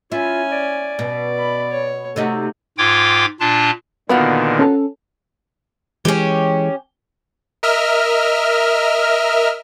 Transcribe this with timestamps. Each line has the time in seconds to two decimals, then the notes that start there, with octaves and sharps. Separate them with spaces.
0.12 C#4 E4 F4 G#5
0.52 D5
0.99 B2
1.38 B5
1.71 C#5
2.16 C3 A3 D#4 F#4 A4
2.78 G#2 F4 G5 D6 G#6
3.40 A#2 D4 F4 A5
4.09 A#2 D3 D#3 B3 F4 F#4 A#4
4.59 C#4 A4
6.05 E3 G#3 C#4 G4
7.63 A#4 D#5 E5 F6